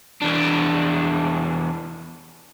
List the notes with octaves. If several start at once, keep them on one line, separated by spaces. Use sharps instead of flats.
E2 D4